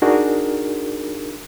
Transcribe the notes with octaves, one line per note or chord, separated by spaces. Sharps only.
D4 D#4 F#4 G#4 A#4